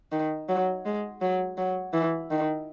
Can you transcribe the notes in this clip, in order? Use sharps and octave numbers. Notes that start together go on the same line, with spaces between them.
D#3
F#3
G#3
F#3
F#3
E3
D#3